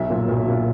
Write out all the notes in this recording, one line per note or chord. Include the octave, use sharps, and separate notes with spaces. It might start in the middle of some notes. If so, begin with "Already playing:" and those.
Already playing: B1 E5
A#2 F#3
B1
A#2 F#3